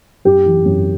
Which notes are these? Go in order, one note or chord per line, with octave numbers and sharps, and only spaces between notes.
F#2 G4
E3
F#2